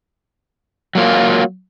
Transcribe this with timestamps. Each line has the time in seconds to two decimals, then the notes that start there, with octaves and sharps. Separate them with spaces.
0.95 F#3 A#3 F4